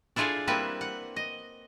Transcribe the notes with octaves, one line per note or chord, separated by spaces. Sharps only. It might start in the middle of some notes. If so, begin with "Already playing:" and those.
D4 E4 F4 G#4 A4 D5
G3 A#3 C4 E4 B4
F#5
D#5